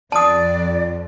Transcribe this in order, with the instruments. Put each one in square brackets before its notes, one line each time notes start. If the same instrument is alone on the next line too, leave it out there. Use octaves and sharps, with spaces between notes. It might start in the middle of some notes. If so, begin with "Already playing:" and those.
[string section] F2 [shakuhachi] D5 [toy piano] A5 D#6